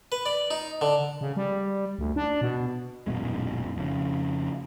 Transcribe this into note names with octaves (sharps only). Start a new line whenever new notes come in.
B4
D5
D#4
D3
C#3
G3
D2
D4
B2
D#1 F#2 B2 G#3
F2 C#3